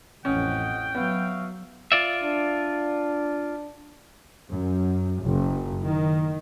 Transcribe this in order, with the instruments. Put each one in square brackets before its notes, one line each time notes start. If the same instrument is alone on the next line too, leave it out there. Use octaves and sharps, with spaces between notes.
[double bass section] A1 F2 [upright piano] C#4 [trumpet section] D#5 F#5 [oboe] G5
[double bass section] F#3 [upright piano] B3 [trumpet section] F#4 E5 F5
[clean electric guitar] F4 D5 E5
[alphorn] D4
[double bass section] F#2
F#1
D#3